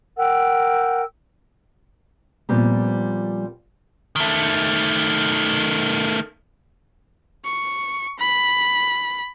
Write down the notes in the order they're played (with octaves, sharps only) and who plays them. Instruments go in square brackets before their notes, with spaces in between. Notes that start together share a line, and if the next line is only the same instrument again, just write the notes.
[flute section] A#4 F#5 G5 E6
[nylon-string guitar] A#2 F3 G3 B3 C4
[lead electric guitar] D#3 A3
[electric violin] C#6
B5